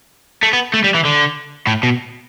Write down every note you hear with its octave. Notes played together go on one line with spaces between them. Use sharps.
A3
B3
A3
G3
E3
D3
A2
B2